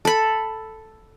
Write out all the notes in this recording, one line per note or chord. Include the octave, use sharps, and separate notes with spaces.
A4 B5